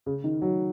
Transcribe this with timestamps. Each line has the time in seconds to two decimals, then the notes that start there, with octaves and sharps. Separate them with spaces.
0.06 C#3
0.24 D#3
0.42 F#3